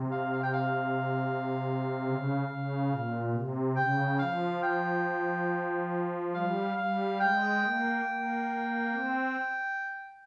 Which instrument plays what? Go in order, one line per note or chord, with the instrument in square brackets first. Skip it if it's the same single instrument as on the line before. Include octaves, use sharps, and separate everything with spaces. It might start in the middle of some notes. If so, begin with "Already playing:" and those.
Already playing: [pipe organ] C3
[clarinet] F5
F5
G5
F5
[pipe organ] C#3
C#3
A#2
C3
[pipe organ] C#3 [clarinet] G5
[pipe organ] F3 [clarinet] F5
[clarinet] G5
[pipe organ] G3 [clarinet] F5
[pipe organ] G3 [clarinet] F5
[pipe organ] G#3 [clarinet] G5
[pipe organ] A#3
A#3
C4